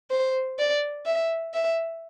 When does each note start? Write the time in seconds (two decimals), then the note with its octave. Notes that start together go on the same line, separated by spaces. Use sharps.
0.11 C5
0.59 D5
1.06 E5
1.54 E5